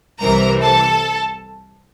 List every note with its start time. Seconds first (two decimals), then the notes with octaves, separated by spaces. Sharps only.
0.20 C2 C3 E3 A#4 A#5
0.61 A4 A5